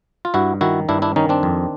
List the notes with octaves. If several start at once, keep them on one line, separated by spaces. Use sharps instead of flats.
F4
G2 E4 F#4
D#3 E4 F#4
G2 D4 E4
D4 E4
D#3 C#4 D#4
C4 D4
F2